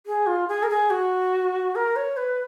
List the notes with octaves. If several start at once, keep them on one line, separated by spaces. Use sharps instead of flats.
G#4
F4
G#4
A#4
G#4
F#4
A#4
C#5
B4